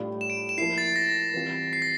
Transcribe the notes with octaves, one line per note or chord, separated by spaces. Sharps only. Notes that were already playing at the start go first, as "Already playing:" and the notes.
Already playing: A2 G3 D4 F4
E7
D7
E7
F3 A#3 E4 C7
A6
A#6
E3 G3 C4 F4
C7
A#6